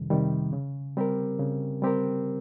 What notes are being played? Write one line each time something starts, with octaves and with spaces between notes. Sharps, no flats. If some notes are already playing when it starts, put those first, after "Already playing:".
Already playing: F2 C3 D#3 G3
C3 D#3 G3
C#3
G3 C4 G4 A#4
C#3
G3 C4 G4 A#4